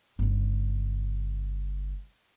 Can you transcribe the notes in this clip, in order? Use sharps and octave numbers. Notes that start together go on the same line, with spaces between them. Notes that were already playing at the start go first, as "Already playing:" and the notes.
G1 C#3